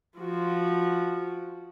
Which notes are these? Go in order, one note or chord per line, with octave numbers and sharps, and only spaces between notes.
F3 F#4